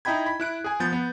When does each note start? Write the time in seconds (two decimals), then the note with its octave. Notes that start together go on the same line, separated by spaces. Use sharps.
0.05 D#4 E4 D#5 G5 B5 G#6
0.26 B5
0.40 E4 F#6 D7
0.64 G#4 G#5
0.80 F3 B3 G6 A6
0.93 B3